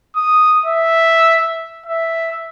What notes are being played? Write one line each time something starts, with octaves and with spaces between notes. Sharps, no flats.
D#6
E5
E5